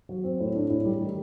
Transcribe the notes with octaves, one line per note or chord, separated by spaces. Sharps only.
F#3
C4
A2
D4
A2
G3
D#3